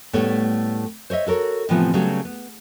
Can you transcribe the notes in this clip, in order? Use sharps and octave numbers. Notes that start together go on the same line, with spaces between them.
A2 G3 A3 B3 C#5
C5 C#5 D#5 E5
F#4 A4 A#4 C#5
A2 C3 E3 F3 B3
C#3 F#3 G3 A3 B3 F#4
B3